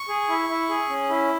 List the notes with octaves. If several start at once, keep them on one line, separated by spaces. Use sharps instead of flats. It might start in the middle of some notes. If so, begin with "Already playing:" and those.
Already playing: C#6
G#4
E4
E4
G#4
C#4
E4